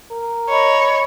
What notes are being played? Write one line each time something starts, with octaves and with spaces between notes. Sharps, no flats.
A#4
C#5 D#5 B5